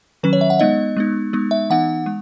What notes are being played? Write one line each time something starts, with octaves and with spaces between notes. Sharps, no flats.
D#3 F#3 C#4 B4
C#5
E5
F#5
G#3 B3 D#4 D#5
G#3 B3 D#4
G#3 B3 D#4
E5
E3 B3 D#4 F#5
G#3